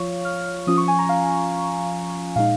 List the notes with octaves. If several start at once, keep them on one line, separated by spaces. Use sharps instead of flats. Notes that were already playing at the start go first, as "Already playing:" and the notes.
Already playing: F3 F4 C#5 F5 C#6
F6
F3 C#4 F4 D#6
C#6
G#5
A#5
F5
A#2 G#3 D#4 F5